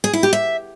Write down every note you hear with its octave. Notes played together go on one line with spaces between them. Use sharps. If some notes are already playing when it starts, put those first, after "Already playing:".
G#4
E4
G4
E5